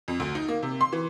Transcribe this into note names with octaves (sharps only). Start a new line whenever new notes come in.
F2
D2
D#4
A#3
C3
C6
E3